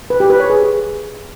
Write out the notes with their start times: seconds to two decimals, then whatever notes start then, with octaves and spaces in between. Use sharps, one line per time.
0.10 B4
0.20 G4
0.30 B4
0.40 C#5
0.50 G#4